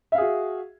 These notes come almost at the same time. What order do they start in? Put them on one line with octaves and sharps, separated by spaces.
E5 F5 G#4 F#4